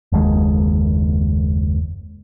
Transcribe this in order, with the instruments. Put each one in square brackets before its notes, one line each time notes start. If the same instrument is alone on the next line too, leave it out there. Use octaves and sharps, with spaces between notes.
[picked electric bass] F#1 D#2 D#3 G#3